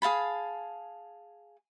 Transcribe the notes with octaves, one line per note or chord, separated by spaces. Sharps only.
G#4 F5 A5 B5